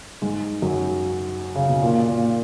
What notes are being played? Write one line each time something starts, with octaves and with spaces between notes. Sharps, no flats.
G#2 G#3
F#2 F#3
C#3
B2
A#2
A#2